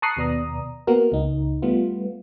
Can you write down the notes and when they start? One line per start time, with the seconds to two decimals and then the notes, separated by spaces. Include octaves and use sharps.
0.02 A5 A#5 C#6 D#6 F#6 C7
0.17 D#2 B2 B3 D5 A#5 D#6
0.87 A#3 B3 F#4 A#4
1.12 C#2 D#4
1.62 G3 A3 B3 F4